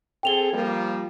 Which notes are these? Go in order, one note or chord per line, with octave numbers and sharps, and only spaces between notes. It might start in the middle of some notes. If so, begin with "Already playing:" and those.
C4 G#4 A4 G5 F7 G7
F3 G3 A#3